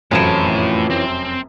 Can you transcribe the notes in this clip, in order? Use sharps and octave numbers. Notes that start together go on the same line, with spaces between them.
F1 F#2 A2 E3 F3 C#4 A5
C4